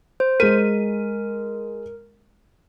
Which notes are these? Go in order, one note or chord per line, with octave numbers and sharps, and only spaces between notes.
C5
G#3 A#4 D#7